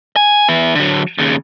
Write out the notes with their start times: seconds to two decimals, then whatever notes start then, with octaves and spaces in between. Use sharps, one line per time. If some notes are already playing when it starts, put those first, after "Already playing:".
0.16 G#5
0.49 B3 E4
0.75 D3 F#3
1.18 D#2 C#3